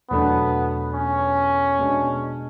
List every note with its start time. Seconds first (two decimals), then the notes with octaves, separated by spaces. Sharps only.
0.10 E2 B2 F#3 A3 B3 D4
0.94 C#4
1.79 B2 G#3 D4